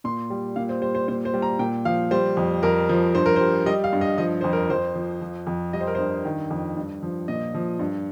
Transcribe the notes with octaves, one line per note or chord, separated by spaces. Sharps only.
A#2 C6
G3
A#2 F5
C5
G3 C5
C5
A#2 C5
C5
G3
A#5
A#2 G5
F3 F5
G3 C5
F2
F2 A#4
F3
G2 C5
A#4
C5
G3
G3 D#5
F5
G2
D#5
F3 D#5
F2 C5
A#4
F2 C5
F3
F3
F2
G3 D#5
C5
A#4
G2 C5
D#3
F2
G2
F3
A#2 D#5
F3
G2